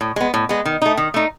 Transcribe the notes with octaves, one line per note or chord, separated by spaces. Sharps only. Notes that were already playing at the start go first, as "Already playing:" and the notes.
A2
G#3 B3
A2
G#3 B3
D#3
A3 D#4
D#3
A3 D#4